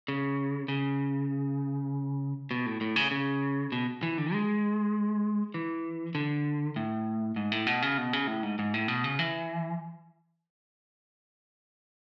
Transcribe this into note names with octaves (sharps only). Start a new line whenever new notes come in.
C#3
C#3
B2
A2
A2
C#3
C#3
B2
E3
D3
G#3
E3
D3
A2
G#2
A2
B2
C#3
B2
C#3
A2
G#2
G#2
A2
B2
C#3
E3